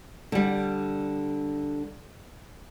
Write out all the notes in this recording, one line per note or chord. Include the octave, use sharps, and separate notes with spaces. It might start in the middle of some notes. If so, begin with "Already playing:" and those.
D3 G3